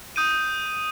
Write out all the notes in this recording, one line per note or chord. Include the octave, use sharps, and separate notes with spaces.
D#6 G6 D7 D#7